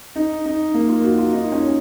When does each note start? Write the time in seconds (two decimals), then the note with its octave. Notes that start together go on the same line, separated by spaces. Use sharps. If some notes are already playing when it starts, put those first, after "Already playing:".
0.16 D#4
0.45 D#4
0.74 A#3
0.89 F4
1.03 F#4
1.18 F4
1.33 D#4
1.52 C#4